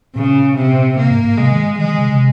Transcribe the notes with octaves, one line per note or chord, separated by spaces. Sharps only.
A#2 C#3
C3
C3 A#3
G#2
G#2
C3 G#3
D#3
D#3 G#3
D#3
C#3
C3